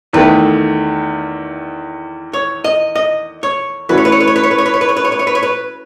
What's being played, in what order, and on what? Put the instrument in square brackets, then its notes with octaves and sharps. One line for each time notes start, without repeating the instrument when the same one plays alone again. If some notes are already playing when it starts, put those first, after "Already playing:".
[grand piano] E2 D#3 A3 [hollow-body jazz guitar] B4
[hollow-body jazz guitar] C#5
D#5
D#5
C#5
[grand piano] E3 A3 C#4 F#4 [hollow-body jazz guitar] B4
[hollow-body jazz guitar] C#5
B4
C#5
B4
C#5
B4
C#5
B4
C#5
B4
C#5
B4
C#5
B4
C#5
B4
C#5
B4
C#5
B4